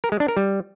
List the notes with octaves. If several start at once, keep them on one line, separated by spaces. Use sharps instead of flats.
A#4
G#3
D4
A#4
G3